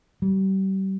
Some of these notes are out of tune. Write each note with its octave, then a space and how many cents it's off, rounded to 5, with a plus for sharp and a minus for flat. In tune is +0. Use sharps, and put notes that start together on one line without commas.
G3 -35